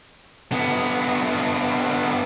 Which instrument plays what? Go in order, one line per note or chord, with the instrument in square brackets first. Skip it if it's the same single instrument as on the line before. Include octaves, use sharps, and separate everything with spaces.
[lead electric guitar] D3 B3